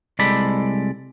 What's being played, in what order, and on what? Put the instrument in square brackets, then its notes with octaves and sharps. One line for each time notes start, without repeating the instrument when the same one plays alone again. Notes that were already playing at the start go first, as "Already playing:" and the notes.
[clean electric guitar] C2 G#3 A4 D5 B5